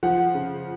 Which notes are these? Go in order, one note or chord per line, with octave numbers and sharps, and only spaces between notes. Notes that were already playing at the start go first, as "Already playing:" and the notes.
F3 F#5
C#3